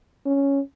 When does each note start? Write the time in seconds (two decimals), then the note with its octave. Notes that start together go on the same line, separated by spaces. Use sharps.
0.26 C#4